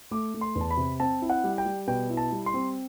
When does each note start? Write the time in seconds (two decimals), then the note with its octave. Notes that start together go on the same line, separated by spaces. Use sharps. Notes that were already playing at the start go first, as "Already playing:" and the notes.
0.11 A3 D6
0.34 A3
0.41 C6
0.55 E2
0.61 A5
0.71 B5
0.77 C3
1.00 C4 A5
1.22 E4
1.30 F#5
1.44 G3
1.58 G5
1.66 G3
1.87 B2 G5
2.10 E4
2.17 A5
2.32 G3
2.46 C6
2.54 C4